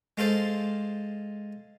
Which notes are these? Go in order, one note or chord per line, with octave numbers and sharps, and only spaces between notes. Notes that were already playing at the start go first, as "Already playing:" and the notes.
G#3 F4 A4 C5